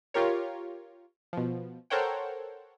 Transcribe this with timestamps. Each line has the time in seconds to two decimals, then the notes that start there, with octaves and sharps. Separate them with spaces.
0.14 F4 G4 A#4 C#5
1.33 B2 F3
1.90 A4 A#4 C5 C#5 F#5 G5